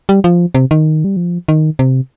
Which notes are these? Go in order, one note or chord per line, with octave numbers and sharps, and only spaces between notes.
G3
F3
C3
D#3
G3
F3
D#3
C3